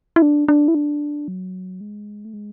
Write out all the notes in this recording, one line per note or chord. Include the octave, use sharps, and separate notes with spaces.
E4
D4
D4
E4
D4
F#3
G#3
A3
G#3